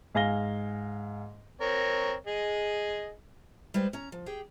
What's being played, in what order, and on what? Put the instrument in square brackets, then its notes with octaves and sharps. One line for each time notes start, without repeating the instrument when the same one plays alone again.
[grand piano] G#2 F5 G#5 A#6 G7
[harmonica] C4 A#4 C#5
G#4 D#5
[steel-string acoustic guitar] G3 G#3 G4 B4 C5
C#4 A#5
F3
G4 G#4 G5